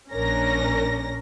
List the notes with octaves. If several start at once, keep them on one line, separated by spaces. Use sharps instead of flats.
A#1 C#4 D4 A#4 A#6